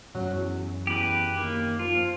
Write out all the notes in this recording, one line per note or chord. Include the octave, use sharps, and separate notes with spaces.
F#2 F#3 C#4
E2
E2 G4 B4
D#2 A#3
F3 F4